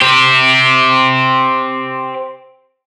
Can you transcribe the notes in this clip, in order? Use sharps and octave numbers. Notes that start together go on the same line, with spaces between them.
C4 G4